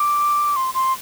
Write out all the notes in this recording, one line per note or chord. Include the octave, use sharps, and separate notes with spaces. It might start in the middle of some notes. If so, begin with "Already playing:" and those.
Already playing: D6
C6
C6